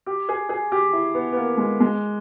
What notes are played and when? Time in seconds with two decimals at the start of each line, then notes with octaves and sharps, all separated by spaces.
0.06 G4
0.29 G#4
0.49 G#4
0.72 G4
0.93 E4
1.14 B3
1.32 B3
1.36 A#3
1.57 G#3
1.80 G#3